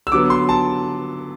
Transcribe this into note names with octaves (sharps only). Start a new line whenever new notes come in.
E6
D3 F#3 B3 D6
C6
A5